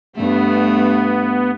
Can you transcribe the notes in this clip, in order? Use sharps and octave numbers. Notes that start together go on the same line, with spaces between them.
G2 A3 B3